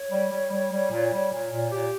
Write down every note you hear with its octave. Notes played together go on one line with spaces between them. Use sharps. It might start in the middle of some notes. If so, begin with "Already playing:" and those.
Already playing: C#5
G3
G3
G3
G3
A#2
G3
A#2
A#2
A#2 G4